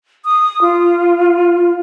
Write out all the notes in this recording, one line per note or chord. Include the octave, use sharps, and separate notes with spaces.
D#6
F4